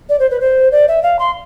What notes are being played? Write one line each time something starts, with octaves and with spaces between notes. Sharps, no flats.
D5
C5
B4
C5
D5
E5
F5
C6